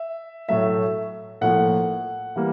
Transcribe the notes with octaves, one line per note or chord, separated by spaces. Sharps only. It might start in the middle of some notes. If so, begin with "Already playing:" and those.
Already playing: E5
A2 F#3 A3 E5
A2 F3 A#3 F#5
E3 G3 A#3